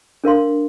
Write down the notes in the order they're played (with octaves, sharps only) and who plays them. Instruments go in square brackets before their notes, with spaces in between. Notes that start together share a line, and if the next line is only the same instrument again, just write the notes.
[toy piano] D4 A#4 F5 C6